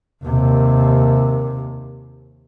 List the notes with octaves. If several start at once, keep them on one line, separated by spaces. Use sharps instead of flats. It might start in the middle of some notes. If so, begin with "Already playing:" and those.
D#2 C3